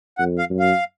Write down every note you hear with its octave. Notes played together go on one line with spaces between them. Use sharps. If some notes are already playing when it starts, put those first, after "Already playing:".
F2 F#5
F5
F#2
F5